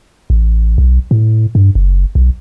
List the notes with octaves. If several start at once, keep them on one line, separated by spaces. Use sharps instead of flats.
A1
B1
A2
G2
F#1
B1